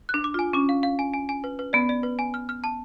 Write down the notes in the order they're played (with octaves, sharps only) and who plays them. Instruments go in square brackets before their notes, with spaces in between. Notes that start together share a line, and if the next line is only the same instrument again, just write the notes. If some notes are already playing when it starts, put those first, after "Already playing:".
[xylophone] F#6
[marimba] D4
[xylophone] D6
[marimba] F4 [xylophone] G#5
[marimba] C#4 [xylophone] D6
[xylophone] F5
F5
G#5
G#5
G#5
B4
B4
[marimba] B3 [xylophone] D5
[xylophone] D5
B4
G#5
F6
F6
A5